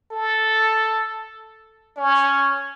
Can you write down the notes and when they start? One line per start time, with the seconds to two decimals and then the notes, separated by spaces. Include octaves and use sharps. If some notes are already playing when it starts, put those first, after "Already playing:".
0.12 A4
1.97 C#4